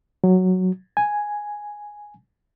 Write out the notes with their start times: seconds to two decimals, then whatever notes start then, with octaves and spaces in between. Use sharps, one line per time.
0.24 F#3
0.97 G#5